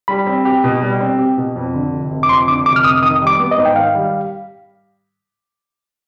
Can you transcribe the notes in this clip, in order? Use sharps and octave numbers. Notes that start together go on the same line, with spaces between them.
G3 B5
C4
G4
B2
G3
C4
G4
B2
F2
D3
F1
F1
D6
F2 C6
D3 D6
F1 D6
F6
F1 D#6
D#3 D#6
G3
D6
B3
D#5
G#2
G5
D#3 F5
G3